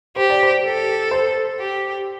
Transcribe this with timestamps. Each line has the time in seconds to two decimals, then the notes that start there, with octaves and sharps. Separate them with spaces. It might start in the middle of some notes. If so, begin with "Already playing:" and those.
0.16 G4 C5
0.30 D5
0.43 C5
0.65 A4
1.11 C5
1.59 G4